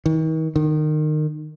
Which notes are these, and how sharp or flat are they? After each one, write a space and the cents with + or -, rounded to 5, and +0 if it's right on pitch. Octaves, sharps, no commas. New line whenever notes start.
D#3 +40
D#3 -25